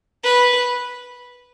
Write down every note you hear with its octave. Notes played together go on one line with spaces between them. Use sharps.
B4